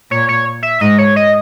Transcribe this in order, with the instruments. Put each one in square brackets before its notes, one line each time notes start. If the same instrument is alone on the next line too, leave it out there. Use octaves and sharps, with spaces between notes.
[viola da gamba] A#2 [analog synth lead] C#5
[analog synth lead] C#5
E5
[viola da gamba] G#2 [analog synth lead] D#5
[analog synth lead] C#5
D#5